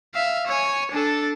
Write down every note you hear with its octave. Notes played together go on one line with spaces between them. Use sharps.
E5 F5
C#5 G#5
D4 A4